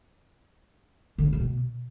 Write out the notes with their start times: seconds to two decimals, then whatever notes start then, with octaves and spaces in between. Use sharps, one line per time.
1.18 D3
1.26 A#3
1.33 C#3
1.40 B2